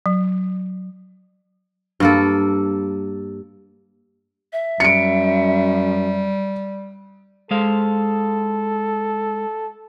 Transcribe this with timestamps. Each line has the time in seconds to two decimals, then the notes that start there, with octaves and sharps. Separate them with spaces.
0.06 F#3
2.00 G2 A#3 A4
4.53 E5
4.80 F#2 G3 C#7 D7
7.51 G#3 A4 C5 F5